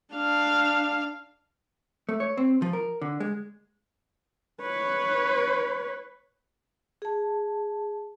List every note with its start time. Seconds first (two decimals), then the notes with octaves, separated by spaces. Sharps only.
0.14 D4 F5
2.09 A3
2.20 C#5
2.38 C4
2.62 F3
2.73 A#4
3.01 D3
3.20 G#3
4.61 B4 C#5
7.02 G#4 A5